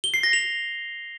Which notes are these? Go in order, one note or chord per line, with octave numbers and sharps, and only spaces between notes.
G7
C7
A#6
F7